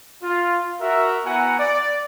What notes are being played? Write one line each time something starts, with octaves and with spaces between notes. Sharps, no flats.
F4
F#4 A#4 E5
B3 E4 F#4 F#5 G#5 A#5
D5